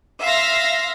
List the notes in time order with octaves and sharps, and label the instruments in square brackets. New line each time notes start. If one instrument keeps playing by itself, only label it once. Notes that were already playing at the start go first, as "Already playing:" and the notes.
[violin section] E5 F5 C6 A#6